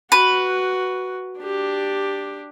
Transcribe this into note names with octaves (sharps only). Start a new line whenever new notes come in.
F#4 B4
D4 G4